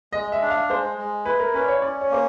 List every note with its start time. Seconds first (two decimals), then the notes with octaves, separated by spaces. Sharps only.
0.13 G#3 D#5
0.32 E5
0.41 D4
0.51 F5
0.69 G#3 C5
0.98 G#3
1.25 E4 B4
1.39 A#4
1.54 C#4 B4
1.61 D5
1.68 C#5
1.82 C#4 D5
2.01 C#5
2.11 A#3 C5